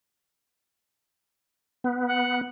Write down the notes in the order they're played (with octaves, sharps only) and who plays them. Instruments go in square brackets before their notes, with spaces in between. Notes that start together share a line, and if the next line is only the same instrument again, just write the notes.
[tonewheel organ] B3
[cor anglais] F#5